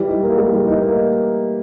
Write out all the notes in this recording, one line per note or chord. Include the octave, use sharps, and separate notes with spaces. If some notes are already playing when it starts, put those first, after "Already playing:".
Already playing: E3 G3
D#4
A#3
G3
E3
D#4
A#3